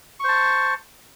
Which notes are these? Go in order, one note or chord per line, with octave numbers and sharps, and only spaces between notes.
C5 A5 C#6